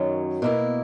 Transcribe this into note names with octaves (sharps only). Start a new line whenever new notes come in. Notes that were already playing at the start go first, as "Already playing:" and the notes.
Already playing: F#2 D#3 F#3 C#4
B2 A#3 E4